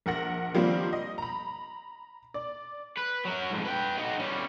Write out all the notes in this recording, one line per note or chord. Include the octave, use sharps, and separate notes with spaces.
A#1 A#4 F#5 A#6
D#3 F3 G3 A#3 C4 D4
D#5
A#5 B5
D5
B4
F#3 A#4
F2 G#2
B4 G5
D#4 F#4
G3 C#4